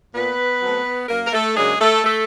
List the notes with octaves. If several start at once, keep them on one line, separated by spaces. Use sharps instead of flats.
A#2 B3 B4
F#3 A3 C4
F#2 A#3 A#4
A#4
A3 A4
C#3 F#3 G#3 A#3 D4 G#4
A3 A4
A3 A4